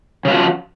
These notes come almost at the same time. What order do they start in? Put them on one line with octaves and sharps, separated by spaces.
C#3 F4 F#4 F3